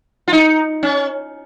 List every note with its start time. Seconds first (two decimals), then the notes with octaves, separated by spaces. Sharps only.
0.28 F4
0.33 D#4
0.83 C#4